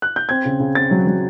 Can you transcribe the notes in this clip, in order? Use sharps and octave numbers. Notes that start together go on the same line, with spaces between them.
F#6
G6
C4 G#6
C#3
C#3
C4 A6
F#3
F#3